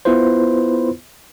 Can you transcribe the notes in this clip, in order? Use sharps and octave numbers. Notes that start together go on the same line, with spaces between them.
B3 E4 F4 B4 C5